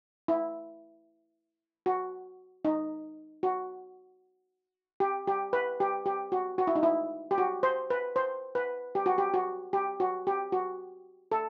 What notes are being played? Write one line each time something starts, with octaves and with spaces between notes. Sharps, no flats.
E4
F#4
D#4
F#4
G4
G4
B4
G4
G4
F#4
F#4
E4
D#4
E4
G4
F#4
C5
B4
C5
B4
G4
F#4
G4
F#4
G4
F#4
G4
F#4
A4